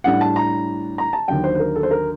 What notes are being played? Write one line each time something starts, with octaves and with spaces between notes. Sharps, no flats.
A2 G3 D4 F#5
A5
A#5
A#5
A5
D#2 D3 F#3 G5
C5
C5
A#4
A4
C5
A#4